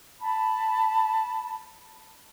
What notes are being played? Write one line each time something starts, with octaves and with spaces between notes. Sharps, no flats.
A5 B5